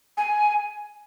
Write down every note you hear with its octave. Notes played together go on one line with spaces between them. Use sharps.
G#5